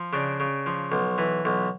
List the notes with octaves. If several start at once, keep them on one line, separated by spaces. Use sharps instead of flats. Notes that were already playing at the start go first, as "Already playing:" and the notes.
Already playing: F3
C#3 D4
C#3
F3
B1
E3
B1